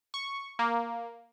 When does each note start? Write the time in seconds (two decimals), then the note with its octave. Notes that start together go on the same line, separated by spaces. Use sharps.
0.14 C#6
0.59 A#3